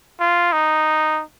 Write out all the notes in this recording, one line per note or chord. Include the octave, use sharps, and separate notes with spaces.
F4
D#4